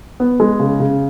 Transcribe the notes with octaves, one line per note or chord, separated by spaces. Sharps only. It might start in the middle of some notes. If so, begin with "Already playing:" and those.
B3
G#3
C#3
C#3